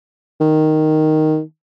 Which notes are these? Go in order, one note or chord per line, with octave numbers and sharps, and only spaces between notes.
D#3